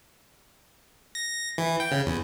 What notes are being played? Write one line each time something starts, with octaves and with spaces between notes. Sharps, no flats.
A#6
E3
G5
C#3
E2